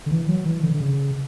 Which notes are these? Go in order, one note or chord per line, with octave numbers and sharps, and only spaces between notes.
D3
E3
F#3
E3
D3
D3
C#3